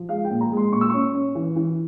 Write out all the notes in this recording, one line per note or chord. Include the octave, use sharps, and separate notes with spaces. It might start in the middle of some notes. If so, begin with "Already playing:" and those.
Already playing: F3
G#3 F5
G5
A#2
A#5
G#3
C6
A#2 C#6
E6
C#4 C#6
C#4
E3
E3